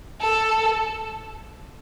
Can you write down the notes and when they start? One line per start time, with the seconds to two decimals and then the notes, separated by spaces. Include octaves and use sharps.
0.21 A4